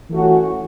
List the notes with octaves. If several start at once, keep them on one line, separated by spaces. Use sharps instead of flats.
E3 A3 C#4 F#4